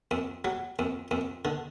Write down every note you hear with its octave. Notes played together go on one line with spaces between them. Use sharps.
F2
F#3
F2
F2
D3